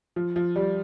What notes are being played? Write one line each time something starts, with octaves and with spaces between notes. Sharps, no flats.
F3
F3
G3